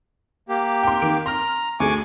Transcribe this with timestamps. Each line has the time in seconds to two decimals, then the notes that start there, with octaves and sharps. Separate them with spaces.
0.49 A#3 G4
0.83 G5 C6
1.02 D#3 D7
1.26 A#5 C6 F6
1.80 D2 G#4 G#5 C#6 D6